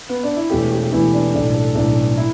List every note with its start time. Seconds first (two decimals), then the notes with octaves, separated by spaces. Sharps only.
0.09 B3
0.23 D4
0.37 E4
0.50 E1 E2 E3 A3 G4
0.71 G4
0.83 G4
0.92 E1 E2 E3 A3 E4
1.13 D4
1.33 B1 A2 A3 D4
1.54 A4
1.75 B1 A2 A3 D4
2.17 E4